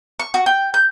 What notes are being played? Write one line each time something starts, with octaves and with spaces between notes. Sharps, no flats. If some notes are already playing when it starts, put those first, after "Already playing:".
C#6
F#4
G5
G6